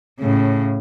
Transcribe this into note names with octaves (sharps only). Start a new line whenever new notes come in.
A2 C#3